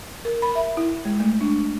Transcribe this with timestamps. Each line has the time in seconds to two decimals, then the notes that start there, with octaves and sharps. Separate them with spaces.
0.25 A#4
0.42 B5
0.55 E5
0.77 E4
1.05 G#3
1.20 A3
1.41 D4